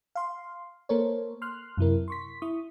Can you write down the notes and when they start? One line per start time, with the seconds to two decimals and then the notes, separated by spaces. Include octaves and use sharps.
0.15 F5 C6
0.89 A#3 A4 A#4 C5 C#5
1.42 C6 F6 F#6
1.77 F#2 C3 E4 A#4
2.08 C6 C#6 B6
2.42 E4 C#6 D#6